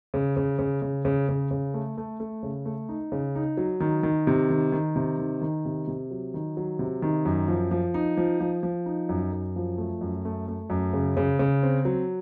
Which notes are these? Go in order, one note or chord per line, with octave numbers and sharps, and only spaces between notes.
C#3
C#3
C#3
C#3
C#3
C#3
C#3
A3
A3
A3
C#3
A3
D#4
C#3
D#4
F#3
D#3
D#3
C3
D#3
D#3
C3
D#3
D#3
C3
C3
F#3
D#3
F#3
C3
D#3
F#2
F3
F3
D#4
F3
F3
F3
D#4
F#2
F#2
F3
A3
F#2
A3
A3
F#2
C#3
C#3
C#3
C4
F#3